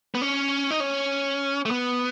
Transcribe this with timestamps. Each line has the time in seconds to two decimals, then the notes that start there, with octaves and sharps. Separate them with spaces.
0.15 B3
0.22 C#4
0.71 D#4
0.80 C#4
1.65 A3
1.71 B3